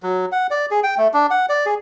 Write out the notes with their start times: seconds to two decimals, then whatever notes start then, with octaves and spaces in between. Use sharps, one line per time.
0.03 F#3
0.32 F#5
0.51 D5
0.71 G#4
0.83 G5
0.98 A3
1.14 D4
1.31 F#5
1.49 D5
1.66 G#4